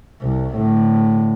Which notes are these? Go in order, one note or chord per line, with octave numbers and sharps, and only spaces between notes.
C2
A2 D3